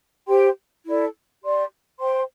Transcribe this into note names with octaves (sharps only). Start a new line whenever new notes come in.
G4 C5 G5 C6
E4 A4 D5
G4 D5 C6
C5 G5 C6